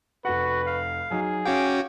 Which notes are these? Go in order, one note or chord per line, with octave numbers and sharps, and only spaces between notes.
F1 F#4 B4 F#5
F5
F#3 D#4 G#4
C#4 F#4 F5 G5 D6